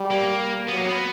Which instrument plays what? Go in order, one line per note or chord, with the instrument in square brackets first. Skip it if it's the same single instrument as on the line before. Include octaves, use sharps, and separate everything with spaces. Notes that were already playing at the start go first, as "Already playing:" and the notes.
Already playing: [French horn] G3
[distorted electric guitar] A#3
[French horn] F#3 [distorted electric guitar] B3
[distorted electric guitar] A#3
B3